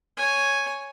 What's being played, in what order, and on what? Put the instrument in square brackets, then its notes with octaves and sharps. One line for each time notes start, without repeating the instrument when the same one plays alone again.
[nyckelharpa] C#5 G#5